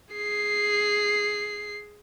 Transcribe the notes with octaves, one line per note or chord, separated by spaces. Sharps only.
G#4 C7